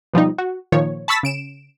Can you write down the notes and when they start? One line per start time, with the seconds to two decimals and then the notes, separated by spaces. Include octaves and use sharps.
0.13 B2 F3 G3 D#4
0.38 F#4
0.72 A#2 D#3 F3 C#5
1.08 A5 B5 C#6 E6 A6 B6
1.23 C#3 D7 E7